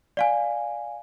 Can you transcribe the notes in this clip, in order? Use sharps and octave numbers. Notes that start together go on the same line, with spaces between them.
D5 F5 G#5